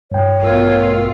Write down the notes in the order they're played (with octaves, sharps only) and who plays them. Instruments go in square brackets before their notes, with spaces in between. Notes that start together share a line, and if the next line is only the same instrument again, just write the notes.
[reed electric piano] G2 G5 [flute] C#5
[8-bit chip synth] A1 A#4 E6 [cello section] B2 A3 F4